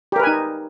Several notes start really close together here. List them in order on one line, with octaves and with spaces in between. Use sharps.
G4 A#4 B4 G#5 D#4